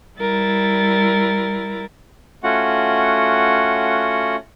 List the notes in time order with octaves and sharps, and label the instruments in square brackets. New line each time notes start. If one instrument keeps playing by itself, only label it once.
[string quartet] G3 E4 A#4 A6
[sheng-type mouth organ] A3 C#4 F4 F#4 F#5